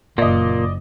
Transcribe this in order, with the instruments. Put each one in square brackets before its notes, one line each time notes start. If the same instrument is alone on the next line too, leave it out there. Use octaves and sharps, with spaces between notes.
[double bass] F#1 [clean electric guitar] A#2 A#3 [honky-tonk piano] D5 D#5